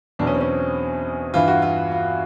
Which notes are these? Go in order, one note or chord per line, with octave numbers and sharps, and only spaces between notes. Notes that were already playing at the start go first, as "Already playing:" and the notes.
E2 B2 F#3 D4
C#4
C4
C#4
G2 E3 F4
F#4
F4
F4